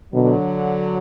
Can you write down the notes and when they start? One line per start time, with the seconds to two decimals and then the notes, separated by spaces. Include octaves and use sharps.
0.13 B2 D3 F#3